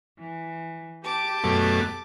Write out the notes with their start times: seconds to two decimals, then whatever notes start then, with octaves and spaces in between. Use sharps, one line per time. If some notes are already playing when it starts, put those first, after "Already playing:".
0.18 E3
1.04 G4 A5 D6
1.44 F#2 B2 A3